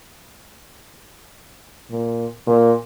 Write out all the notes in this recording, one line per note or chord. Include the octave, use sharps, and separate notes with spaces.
A#2
A#2